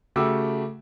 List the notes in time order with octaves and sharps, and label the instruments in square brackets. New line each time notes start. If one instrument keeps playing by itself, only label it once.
[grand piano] C#3 A3 F#4 G4 D6 E6